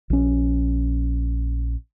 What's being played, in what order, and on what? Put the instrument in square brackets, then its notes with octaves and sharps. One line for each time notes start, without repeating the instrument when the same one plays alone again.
[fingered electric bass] A#1 C#4